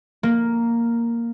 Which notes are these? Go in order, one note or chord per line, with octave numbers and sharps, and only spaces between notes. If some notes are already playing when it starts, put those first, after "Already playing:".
A#3